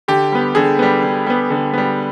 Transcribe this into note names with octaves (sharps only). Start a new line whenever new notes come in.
D3 G4
G3 B3
D3 G#4
G3 B3
D3
G3 B3
D3
G3 B3